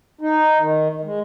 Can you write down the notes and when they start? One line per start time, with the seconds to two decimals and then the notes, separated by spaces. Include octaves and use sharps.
0.21 D#4
0.59 D#3
1.04 G#3